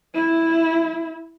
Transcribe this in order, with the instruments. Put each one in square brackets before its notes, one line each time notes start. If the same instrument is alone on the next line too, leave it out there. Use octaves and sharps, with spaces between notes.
[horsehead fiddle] E4